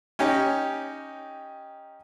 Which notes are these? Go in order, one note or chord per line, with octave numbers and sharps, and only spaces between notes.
C#4 D#4 G4 C#5